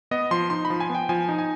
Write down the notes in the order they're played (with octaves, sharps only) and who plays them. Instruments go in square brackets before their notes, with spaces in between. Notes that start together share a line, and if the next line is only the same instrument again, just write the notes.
[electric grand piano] B3 D#5
F3 C6
D#4 C6
B5
F3
G#5
B3
G5
F3 G#5
D#4
G#5